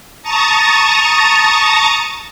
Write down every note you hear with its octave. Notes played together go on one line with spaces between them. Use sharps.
A5 A#5 C#6 D#6 A6